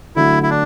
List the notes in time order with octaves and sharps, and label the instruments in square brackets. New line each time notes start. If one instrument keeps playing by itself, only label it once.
[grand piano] D3 F#3 A3 [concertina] E4
[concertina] E4
D4